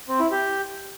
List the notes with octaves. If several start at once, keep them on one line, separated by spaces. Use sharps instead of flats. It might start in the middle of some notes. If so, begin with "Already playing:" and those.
C4
E4
G4